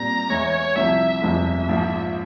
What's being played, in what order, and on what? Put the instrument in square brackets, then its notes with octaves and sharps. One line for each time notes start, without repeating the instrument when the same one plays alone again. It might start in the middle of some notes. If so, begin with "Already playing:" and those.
Already playing: [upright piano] A#2 G3 C4 [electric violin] A#5
[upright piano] E2 E3 G#3 E4 [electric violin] C#5
[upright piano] C2 C3 F3 [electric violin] E5
[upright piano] G1 F2 C3 F3 G#3 [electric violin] E5
[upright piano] A#1 G#2 F3